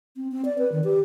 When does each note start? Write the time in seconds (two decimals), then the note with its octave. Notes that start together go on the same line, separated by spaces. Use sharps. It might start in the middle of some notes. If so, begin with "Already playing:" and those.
0.17 C4
0.32 C4
0.45 D5
0.58 B4
0.72 D#3
0.84 G4